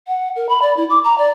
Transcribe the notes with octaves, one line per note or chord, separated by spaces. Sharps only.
F#5
A#4
B5
D5
E4
D6
A#5
D5